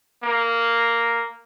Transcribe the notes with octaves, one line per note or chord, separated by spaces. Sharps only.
A#3